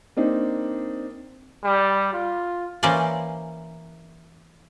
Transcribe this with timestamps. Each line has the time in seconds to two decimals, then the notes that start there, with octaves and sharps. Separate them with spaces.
0.17 A#3 C4 D4 D#4
1.64 G3
2.13 F4
2.83 E3 A#3 C#4 C5 D5